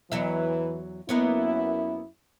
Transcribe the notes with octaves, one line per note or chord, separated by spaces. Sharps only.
E2 E3 F#3 E5
F#2 A#3 B3 E4 C#5